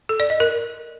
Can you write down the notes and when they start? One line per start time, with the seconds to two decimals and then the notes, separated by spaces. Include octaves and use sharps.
0.09 A4
0.20 D5
0.30 D#5
0.40 A#4